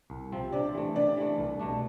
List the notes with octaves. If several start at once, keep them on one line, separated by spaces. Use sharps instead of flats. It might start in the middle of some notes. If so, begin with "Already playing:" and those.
C2
C3 F3 C4
C3 D4 D5
E3 A3
C3 D4 D5
E3 A3
C2
B2 A3 D4